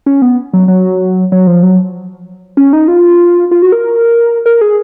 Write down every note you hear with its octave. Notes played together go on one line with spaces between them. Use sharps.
C#4
B3
F#3
F#3
F#3
F3
F#3
C#4
D#4
F4
F4
F#4
A#4
A#4
G#4